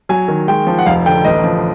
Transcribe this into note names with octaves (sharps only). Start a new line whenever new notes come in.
F#3 G#5
D#3
G#3 G5
F3
F#5
F1 F5
D3 G5
A1 D#5
F3